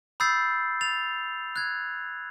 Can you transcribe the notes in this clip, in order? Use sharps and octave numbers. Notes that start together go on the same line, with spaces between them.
B5 D#6 E6 G6 A6 C7
A6 F7
F#6 G#6